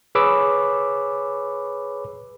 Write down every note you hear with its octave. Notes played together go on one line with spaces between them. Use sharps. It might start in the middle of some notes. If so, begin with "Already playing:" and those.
G#4 B4 C#5 B5 D6 E6